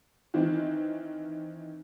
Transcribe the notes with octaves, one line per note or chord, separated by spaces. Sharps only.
D#3 E3 C4